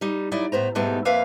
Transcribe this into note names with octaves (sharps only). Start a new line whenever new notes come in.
G3 D#4
F#3 D#4 E4 D5
A2 B3 C5 A#5
G#2 B2 G3 A3 B3 D#4
F2 A#3 B4 E5 F5